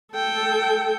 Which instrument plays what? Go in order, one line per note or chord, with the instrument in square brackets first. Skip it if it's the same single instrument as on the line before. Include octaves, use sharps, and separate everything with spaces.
[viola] A4 G5